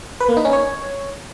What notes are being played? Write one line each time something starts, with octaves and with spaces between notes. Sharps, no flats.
B4
A#3
D#4
C#4
C#5